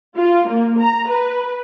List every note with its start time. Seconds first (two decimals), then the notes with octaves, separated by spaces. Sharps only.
0.16 F4
0.48 A#3
0.80 A#5
1.09 B4